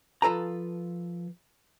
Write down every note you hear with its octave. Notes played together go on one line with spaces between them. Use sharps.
F3 F4 A4 B4 A#5